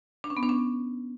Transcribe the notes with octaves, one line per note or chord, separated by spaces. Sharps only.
D4
C#4
B3
D4
C#4